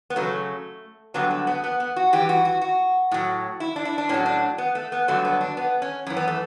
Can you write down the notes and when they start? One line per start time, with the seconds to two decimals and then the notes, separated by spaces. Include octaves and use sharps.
0.10 B3
0.16 F#2 C#3 F#3 A3
1.14 G2 D3 F#3 B3
1.31 A3
1.47 B3
1.64 B3
1.80 B3
1.96 F#4
2.13 G2 E3 G4
2.29 F#4
2.45 F#4
2.61 F#4
3.11 A2 F#3
3.60 E4
3.76 D4
3.85 E4
3.98 D4
4.09 A2 F#3 C#4
4.26 D4
4.58 B3
4.75 A3
4.92 B3
5.08 G2 D3 F#3 A3
5.25 B3
5.41 D4
5.57 B3
5.82 C#4
6.06 F#2 E3 C#4
6.17 B3
6.28 A3